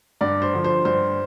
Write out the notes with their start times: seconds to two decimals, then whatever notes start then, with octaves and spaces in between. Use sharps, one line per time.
0.21 G2 D5
0.42 C5
0.53 D3 F3
0.64 C5
0.85 G2 C5